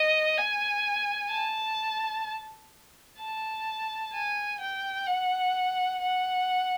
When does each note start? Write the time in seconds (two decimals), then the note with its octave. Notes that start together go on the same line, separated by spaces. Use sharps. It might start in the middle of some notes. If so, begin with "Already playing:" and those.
Already playing: D#5
0.37 G#5
1.31 A5
3.19 A5
4.12 G#5
4.60 G5
5.06 F#5
6.01 F#5